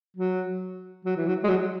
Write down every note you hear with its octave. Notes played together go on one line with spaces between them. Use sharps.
F#3
F#3
E3
F#3
G#3
F#3